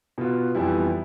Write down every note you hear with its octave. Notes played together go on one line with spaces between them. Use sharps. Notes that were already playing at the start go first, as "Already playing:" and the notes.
B2 B3 F4
F2 E3 G3 B3 E4